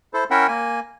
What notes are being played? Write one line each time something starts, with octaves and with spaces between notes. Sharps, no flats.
E4 A4 C5
C#4 E4 A#4 E5 F#5 G5
A#3 G#5